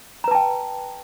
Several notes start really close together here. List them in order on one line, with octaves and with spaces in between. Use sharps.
A#5 B4 A5 G5